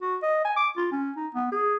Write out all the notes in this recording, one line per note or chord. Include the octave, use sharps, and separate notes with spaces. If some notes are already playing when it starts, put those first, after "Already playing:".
F#4
D#5
G#5
D6
F4
C#4
D#4
B3
G#4